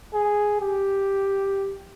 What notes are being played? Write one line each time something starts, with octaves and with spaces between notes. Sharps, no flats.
G#4
G4